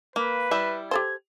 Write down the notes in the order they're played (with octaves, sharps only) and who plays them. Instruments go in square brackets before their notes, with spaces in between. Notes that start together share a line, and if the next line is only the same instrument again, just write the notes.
[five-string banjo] A#3 [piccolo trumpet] B4
[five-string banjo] G3 E4 E5
[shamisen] G4 A4 C5 [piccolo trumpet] G#6